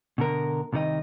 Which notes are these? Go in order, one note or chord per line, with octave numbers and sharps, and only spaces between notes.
B2 D3 A#4
C2 C3 D#3 A4 D#5